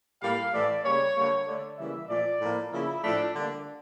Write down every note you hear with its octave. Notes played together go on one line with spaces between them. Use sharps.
A2 G3 A#3 F5
A2 E3 A3 D5
C#3 G3 A#3 C#5
D3 G3 A#3
D3 A3 D5
C#3 E3 G3 A#3 E5
A#2 F3 A3 D5
A2 F3 A#3
C#3 F3 A#3 E4
A2 F3 A3 D4
D3 G3 A#3 D4